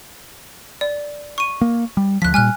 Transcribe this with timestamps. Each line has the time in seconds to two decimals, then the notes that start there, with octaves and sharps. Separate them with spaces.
0.81 D5
1.38 C#6 D#7
1.61 A#3
1.97 G3
2.22 D2 F3 F#6 B6
2.34 A#2 G3 G#5 F6 F#6